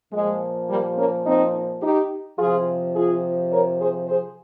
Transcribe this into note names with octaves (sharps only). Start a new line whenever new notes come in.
A#2 F3 G#3
G3 A#3
A#3 C#4
C4 D#4
D#4 G4
C3 F3 F4 G#4
F4 G#4
A#4 C#5
G#4 C5
G#4 C5